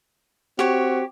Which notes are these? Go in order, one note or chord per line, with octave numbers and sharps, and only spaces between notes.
C4 F#4 G4 C#5